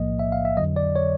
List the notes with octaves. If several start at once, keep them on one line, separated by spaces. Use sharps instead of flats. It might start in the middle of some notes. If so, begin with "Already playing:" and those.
Already playing: B1 A2 F3 A#3 D#5
E5
F5
E5
F2 D3 F#3 D#5
D5
C#5